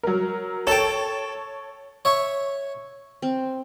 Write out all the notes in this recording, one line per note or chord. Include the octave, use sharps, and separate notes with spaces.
F#3 A#4
A4 C#5 G5 A5
C#5 E5 C#6
C4